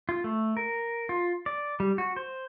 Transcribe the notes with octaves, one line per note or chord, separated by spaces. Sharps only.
F4
A3
A#4
F4
D5
G3
F#4
C5